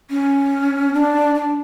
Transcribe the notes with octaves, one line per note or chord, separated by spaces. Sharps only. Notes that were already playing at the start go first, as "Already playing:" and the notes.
C#4
D4
D4